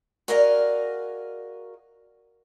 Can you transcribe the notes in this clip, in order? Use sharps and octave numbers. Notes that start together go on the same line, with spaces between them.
F#4 G#4 A#4 D5 D#5 F5